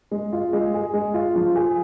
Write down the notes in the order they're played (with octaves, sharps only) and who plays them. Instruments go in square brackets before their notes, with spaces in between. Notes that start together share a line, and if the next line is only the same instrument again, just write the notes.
[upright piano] G#3
F4
G#3
G#4
G#3
F4
F3
G#4